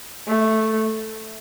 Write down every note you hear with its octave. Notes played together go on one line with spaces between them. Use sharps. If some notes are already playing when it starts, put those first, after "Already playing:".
A3